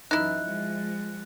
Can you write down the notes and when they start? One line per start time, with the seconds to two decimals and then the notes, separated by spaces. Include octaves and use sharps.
0.11 F#2 E3 D#4 E4 F#6
0.45 F3 G#3